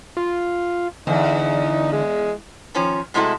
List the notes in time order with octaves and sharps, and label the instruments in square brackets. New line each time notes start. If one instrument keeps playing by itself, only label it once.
[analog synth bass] F4
[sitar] E2 [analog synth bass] D3 [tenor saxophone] D#4
[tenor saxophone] G#3
[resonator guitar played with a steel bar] D#3 F3 C#4
A2 C3 G#3 E4 F#4 A4